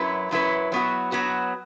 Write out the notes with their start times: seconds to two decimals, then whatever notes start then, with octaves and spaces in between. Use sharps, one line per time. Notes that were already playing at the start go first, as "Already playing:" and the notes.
Already playing: F#2 F#3 E4 B4
0.31 F#2 F#3 E4 B4
0.72 F#3 B3 F#4
1.12 F#3 B3 F#4